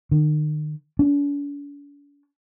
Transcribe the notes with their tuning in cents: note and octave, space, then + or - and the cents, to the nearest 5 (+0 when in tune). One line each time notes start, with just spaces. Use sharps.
D#3 -40
D4 -45